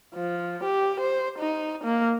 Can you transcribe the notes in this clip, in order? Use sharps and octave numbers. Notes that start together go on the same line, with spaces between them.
F3
G4
C5
D#4
A#3